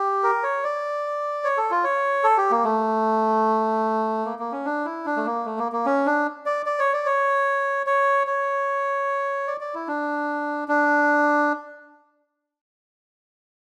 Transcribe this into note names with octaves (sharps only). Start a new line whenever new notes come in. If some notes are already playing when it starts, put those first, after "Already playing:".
Already playing: G4
A#4
C#5
D5
C#5
A4
F4
C#5
A4
G4
A#3
A3
A#3
A#3
C#4
D4
E4
D4
A3
A#3
A3
A#3
A#3
C#4
D4
D5
D5
C#5
D5
C#5
C#5
C#5
D5
D5
E4
D4
D4